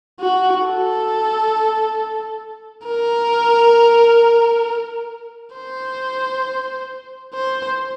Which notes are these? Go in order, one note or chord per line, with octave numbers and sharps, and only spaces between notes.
F#4
A4
A#4
C5
C5